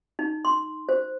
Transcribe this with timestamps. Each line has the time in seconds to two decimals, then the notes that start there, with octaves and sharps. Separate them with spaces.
0.19 D#4
0.45 C6
0.89 C5